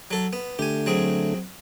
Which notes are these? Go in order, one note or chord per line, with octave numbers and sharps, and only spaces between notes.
F#3 A4
B3
D3 A3 G4 G#5
F#3 C4 G#4